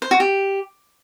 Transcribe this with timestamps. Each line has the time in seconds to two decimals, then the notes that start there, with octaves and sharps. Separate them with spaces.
0.02 C5
0.11 F#4
0.20 G4